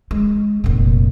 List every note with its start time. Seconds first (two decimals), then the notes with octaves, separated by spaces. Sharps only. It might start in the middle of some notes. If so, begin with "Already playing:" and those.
0.11 G#3
0.64 F1 A#2